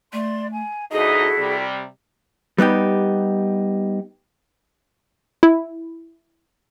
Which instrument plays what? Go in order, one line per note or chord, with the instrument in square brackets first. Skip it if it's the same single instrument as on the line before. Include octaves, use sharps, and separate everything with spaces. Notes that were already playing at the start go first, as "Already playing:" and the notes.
[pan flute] A3 [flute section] D5 C6
[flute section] G#5
[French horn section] D2 D#4 D#5 [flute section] E4 F#4 A4 [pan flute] G#4
[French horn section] C3 G3
[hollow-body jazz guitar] G3 B3 D#4 G4
[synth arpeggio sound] E4